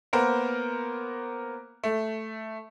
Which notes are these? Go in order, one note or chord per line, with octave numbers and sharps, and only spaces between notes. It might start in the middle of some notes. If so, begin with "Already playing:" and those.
A#3 B3 A#4 C5
A3